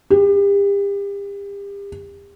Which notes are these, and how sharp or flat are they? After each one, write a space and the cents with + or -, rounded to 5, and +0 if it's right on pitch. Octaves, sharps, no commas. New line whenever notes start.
G4 +35